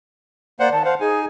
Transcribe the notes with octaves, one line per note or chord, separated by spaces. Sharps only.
A#3 C5 D5 F#5
D#3 A5
C5 F5 F#5
D#4 G#4 G#5